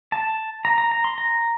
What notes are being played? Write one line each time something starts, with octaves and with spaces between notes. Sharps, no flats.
A5
A#5
A#5
A#5
C6
A#5